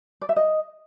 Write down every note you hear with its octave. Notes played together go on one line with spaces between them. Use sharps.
D5
E5
D#5